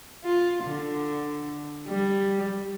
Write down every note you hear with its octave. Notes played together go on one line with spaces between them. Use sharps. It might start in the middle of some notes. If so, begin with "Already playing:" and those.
F4
D3
G3